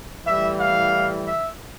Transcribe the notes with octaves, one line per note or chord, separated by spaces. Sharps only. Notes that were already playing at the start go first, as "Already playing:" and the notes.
A2 E3 G3 E5
F5
E5